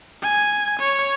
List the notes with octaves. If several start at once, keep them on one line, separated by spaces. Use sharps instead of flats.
G#5
C#5